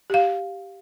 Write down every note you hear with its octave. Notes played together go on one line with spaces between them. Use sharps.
G4 F5